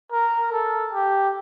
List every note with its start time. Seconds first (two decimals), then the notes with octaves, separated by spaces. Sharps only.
0.12 A#4
0.52 A4
0.93 G4